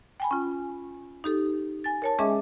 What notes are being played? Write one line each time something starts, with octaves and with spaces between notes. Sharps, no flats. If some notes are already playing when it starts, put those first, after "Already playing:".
G5 G#5 B5
C#4 F4
D#4 G4 A4
G#5 A6
A#4 C#5 A5
G#3 C#4 G#4 D#5 E5 D6